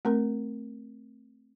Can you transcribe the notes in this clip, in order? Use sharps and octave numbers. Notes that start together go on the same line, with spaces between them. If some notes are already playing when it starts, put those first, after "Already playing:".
A3 C4 A#4